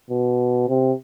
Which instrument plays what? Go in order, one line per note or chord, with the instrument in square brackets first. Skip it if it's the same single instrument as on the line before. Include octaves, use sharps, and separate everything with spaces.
[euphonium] B2
C3